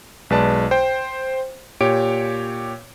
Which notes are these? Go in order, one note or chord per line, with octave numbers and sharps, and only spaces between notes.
B1 G#3 B4 D5 A5
C5 G5
A#2 G4 C#5 D7